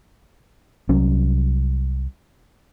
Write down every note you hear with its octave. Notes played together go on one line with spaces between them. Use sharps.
C2 F#3 C#4